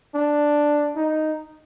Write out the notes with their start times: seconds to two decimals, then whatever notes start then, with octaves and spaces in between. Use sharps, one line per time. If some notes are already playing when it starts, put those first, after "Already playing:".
0.15 D4
0.96 D#4